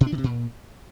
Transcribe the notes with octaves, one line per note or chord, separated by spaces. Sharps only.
B2
D4
D#3
C3
A#2